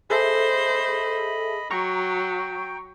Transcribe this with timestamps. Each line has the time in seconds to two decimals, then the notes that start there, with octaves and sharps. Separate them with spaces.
0.10 G#4 A4 C5 D#5 E5 B5
1.71 F#3 G5 A#5 C#6